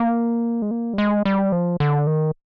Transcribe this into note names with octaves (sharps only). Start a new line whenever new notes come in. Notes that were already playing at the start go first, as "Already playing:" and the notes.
Already playing: A#3
G#3
A#3
G3
G#3
G3
F3
D3
D#3